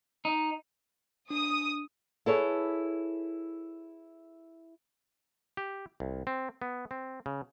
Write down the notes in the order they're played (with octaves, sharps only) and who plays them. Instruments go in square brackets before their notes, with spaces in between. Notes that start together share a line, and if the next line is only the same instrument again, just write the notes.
[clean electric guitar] D#4
[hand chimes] D4 [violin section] D#6
[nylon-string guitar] E4 G#4 A4 B4 C#5
[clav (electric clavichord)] G4
C2
C4
B3
C4
C#3